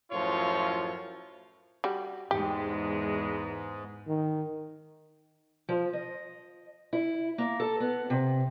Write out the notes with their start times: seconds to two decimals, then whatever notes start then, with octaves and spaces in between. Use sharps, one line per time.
0.12 F#2 A2 F3 F4 C#5
1.84 G3 F#4
2.31 E2 G#2 G#3 G4
4.08 D#3
5.69 F3
5.93 D#5
6.93 E4
7.38 A#3
7.60 A4
7.80 B3
8.10 C3